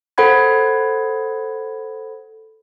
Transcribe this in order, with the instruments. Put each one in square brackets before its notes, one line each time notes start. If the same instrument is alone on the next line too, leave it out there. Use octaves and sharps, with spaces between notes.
[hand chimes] A4 C5 F#5 B5 G#6